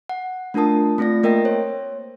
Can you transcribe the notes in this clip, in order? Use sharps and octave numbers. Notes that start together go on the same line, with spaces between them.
F#5
A3 D4 F4 A#4 A5 D#6
A3 C4 F4 D5 A#6
A#3 A#4 D#5 G5 A#6
C5 C#5